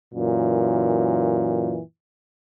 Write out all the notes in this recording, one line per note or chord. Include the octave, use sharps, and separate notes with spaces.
F#2 A#2 E3